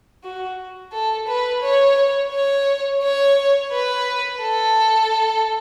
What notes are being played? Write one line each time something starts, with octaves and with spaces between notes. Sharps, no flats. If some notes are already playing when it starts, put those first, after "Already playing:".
F#4
A4
B4
C#5
C#5
C#5
B4
A4